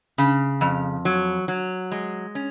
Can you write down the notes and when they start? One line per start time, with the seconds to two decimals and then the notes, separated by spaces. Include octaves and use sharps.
0.18 C#3
0.61 F2
1.05 F#3
1.48 F#3
1.92 G#3
2.35 C#4